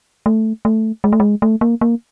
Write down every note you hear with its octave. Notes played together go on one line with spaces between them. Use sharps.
A3
A3
G#3
A3
G#3
A3
A#3
A#3